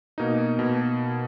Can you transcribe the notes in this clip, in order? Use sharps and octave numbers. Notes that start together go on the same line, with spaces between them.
B2 A#3 D#4
B2